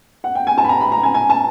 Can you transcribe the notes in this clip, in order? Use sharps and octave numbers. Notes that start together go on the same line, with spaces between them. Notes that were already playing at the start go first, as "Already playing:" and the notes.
F#5
G5
G#5
A5
B5
A#5
B5
A#5
G#5
G#5
A5